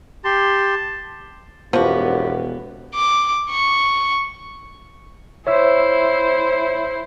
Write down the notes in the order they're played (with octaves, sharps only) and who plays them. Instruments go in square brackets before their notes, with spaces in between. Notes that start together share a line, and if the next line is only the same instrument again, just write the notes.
[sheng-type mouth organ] G4 C6 [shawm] A5
[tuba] E1 [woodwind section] F#2 G4 [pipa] F3 F#4 [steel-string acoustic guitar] B3
[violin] D6
C#6
[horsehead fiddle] E4 C5 [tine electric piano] C#5 E5 E6